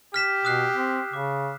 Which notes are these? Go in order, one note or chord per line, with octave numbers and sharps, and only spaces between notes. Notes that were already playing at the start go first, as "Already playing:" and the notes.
G4 F6 B6 E7
B2 D#6 F#6 C7
C4
C#3 D6